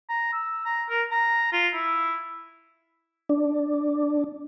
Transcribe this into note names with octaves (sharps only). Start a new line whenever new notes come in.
A#5
E6
A#5
A#4
A#5
F4
E4
D4